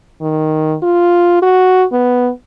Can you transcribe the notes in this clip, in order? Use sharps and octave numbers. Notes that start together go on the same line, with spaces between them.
D#3
F4
F#4
B3